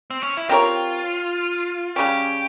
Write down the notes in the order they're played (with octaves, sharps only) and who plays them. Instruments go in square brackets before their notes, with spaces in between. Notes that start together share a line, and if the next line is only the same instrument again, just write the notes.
[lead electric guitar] C4
C#4
E4
[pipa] C4 G4 A#4 C#5 [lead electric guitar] F4
[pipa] C#3 G3 C#4 [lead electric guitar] G4